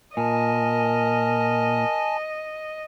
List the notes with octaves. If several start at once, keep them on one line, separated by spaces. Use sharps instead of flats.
A#2 A#4 D#5 G#5 A5